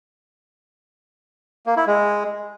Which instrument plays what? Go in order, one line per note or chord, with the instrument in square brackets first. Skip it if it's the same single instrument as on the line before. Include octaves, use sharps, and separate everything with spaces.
[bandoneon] A#3
E4
G#3